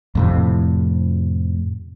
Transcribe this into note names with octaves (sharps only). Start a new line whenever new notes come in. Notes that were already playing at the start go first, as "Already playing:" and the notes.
F2 A2 C3